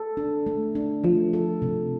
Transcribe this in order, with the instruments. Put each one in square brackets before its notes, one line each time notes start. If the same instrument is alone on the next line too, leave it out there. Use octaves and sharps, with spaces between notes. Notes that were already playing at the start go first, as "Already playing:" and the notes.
Already playing: [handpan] A4
D4
A3
D4
[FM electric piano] F3 [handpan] A3
[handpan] A4
C3